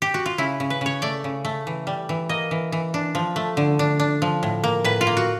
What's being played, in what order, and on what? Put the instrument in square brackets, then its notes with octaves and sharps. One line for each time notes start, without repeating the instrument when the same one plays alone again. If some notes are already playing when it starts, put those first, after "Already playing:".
[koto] G4
F#4
F4
C#3 E4
C#3
B4
C#3 C#5
A3 D5
C#3
A3
E3
G3
E3
A#3 D#5
E3
E3
D4
F3
A3
D3
D4
D4
F3
A2
A#3
A2 B4
F4
A#3
F#4